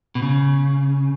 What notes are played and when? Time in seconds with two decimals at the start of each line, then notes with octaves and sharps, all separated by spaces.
0.15 B2
0.22 C#3